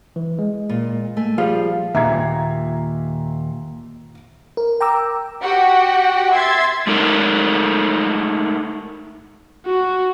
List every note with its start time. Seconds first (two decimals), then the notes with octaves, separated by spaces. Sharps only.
0.16 E3
0.39 G#3
0.69 A#2
1.17 A3 G#5
1.38 F3 G3 F4 G#4 F5
1.95 D#2 A#2 E5 A#5 G#6
4.57 A#4
4.81 G5 A#5 D6 E6
5.42 F#4 G4 F#5 G5
6.33 E5 C6 G#6 A6
6.87 G#3 A3 D#4 A4 A#4
9.66 F#4